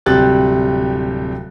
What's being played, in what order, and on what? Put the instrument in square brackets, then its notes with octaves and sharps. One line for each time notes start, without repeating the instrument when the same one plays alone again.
[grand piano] D1 C3 G3 G4 F#6 A6